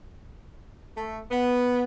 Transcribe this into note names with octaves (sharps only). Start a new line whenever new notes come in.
A3
B3